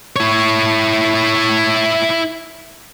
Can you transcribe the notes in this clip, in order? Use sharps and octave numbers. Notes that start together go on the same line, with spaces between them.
E4 C#5